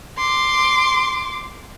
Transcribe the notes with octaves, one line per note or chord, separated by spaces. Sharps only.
C6 D6